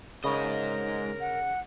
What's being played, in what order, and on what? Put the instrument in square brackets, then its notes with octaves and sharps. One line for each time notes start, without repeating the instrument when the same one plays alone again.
[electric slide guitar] G#2 D#5 [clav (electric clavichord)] C#3 [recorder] A#4
[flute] F#5